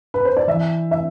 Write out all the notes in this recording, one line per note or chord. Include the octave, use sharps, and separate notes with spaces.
B4
C5
D5
E3 E5
E5